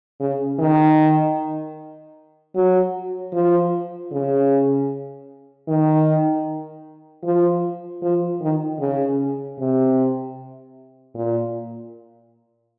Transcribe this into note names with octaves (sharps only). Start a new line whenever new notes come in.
C#3
D#3
F#3
F3
C#3
D#3
F3
F3
D#3
C#3
C3
A#2